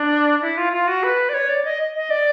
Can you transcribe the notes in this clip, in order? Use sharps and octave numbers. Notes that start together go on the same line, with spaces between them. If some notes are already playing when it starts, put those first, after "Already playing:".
Already playing: D4
E4
F4
F4
F#4
B4
D5
C#5
D5
D#5
D#5
D5